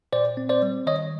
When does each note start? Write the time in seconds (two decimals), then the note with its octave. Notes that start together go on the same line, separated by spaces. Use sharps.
0.13 A#2 C5 D5
0.37 C4
0.49 C5 D5
0.62 G3
0.86 D#3 C#5 D#5